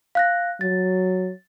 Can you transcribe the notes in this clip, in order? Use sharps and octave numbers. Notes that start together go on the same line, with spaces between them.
F5 F#6 A#6
F#3 A6